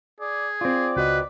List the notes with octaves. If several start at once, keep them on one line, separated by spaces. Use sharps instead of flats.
G#4 D5
C4 F4 D5
C#2 F#4 B4 D#5